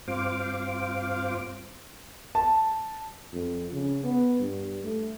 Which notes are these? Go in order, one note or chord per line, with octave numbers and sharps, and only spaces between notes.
G2 C4 F4 C5 F5 D6
A5
F2
C#3
B3
G2
A3